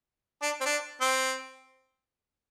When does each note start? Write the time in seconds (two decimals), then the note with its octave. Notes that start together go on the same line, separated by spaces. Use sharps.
0.42 D4
0.61 C4
0.65 D4
1.01 C4